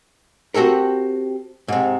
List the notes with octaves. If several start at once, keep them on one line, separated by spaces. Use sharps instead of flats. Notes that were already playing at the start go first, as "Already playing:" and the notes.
C4 F#4 G4 A4 A#4
G#2 C3